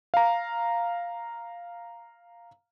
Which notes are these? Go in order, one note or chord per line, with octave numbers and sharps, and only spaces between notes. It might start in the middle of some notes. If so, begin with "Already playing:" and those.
F5 A#5